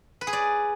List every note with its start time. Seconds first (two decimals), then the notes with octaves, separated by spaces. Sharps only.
0.21 B4
0.27 G#4
0.33 D5